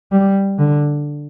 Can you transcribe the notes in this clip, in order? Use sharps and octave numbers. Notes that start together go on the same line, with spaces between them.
G3
D3